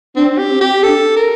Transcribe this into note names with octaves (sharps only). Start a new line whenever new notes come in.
C4 D4
G4
C4
G4
D4 A4
A#4